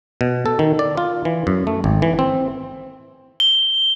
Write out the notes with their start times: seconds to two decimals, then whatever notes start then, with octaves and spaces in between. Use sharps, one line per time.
0.21 B2
0.46 A4
0.59 D#3
0.79 D5
0.97 F4
1.25 E3
1.47 F#2
1.67 A3
1.84 G#1
2.02 E3
2.19 C4
3.40 G7